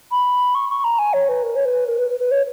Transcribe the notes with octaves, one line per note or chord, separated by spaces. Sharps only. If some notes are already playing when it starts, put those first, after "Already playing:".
B5
C#6
C#6
A#5
G#5
C#5
B4
A#4
C#5
B4
A#4
B4
B4
B4
C#5